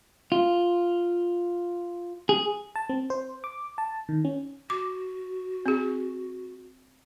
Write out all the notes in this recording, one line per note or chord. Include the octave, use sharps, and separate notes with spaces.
F4
G#4
A5
C4
C5
D6
A5
D#3
C#4
F#4 D6
C4 G#4